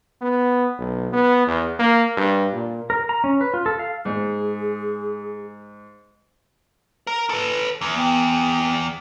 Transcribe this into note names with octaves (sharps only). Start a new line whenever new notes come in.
B3
B1
B3
E2
A#3
G2
A#2
A#4
A#5
C#4
B4
F4
A4
F5
G#2 G#4
A#4
A4 B4
E2
B3 G5